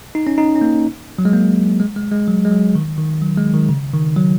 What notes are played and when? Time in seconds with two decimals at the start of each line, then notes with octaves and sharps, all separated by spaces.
0.15 D#4
0.27 C#4
0.38 D#4
0.56 C#4
0.62 A#3
1.19 F#3
1.25 G#3
1.33 A#3
1.80 G#3
1.96 G#3
2.12 G#3
2.28 F#3
2.45 G#3
2.51 F#3
2.75 D#3
2.98 D#3
3.22 F#3
3.37 G#3
3.54 D#3
3.69 C#3
3.94 D#3
4.16 F#3